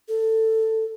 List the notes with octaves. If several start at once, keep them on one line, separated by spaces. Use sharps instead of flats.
A4